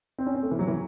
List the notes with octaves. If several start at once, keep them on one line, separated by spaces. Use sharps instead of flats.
C4
C#4
C4
A3
E3
F#3
E3